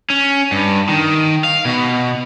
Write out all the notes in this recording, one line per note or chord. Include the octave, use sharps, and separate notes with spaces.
C#4
G2
D#3
F5
B2